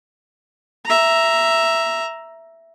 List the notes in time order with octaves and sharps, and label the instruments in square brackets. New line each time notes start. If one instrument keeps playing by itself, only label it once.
[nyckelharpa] E5 A#5